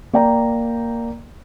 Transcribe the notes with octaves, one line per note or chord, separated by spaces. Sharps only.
A#3 D5 G5 A#5